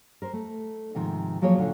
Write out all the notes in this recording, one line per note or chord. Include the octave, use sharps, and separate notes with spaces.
A#4 C5
A3
G#2 C3 D#3 F3
F3 F#3 A#3 G#4 C#5
D2 A#2 D3 F4